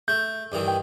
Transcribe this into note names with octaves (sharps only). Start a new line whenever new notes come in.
A3 G6
G2 D#3 E3
G5